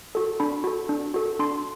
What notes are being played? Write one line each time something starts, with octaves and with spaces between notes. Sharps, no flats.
F#4 A4
D4 B5
F#4 A4
D4
F#4 A4
D4 C6